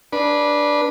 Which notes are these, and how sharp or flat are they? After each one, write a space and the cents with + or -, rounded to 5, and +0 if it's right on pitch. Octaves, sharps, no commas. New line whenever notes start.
D4 +0 B4 -20